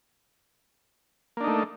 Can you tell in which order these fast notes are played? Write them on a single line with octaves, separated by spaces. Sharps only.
A#3 D4 D#4 A3